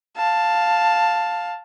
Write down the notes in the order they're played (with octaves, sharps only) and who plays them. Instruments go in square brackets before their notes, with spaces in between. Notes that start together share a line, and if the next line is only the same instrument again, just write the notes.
[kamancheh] F5 A5